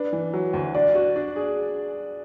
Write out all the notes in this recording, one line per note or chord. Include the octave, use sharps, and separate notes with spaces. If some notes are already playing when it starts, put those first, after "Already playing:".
Already playing: D4 B4
E3
F#3
D2
D4 D5
F#4
D4
G#4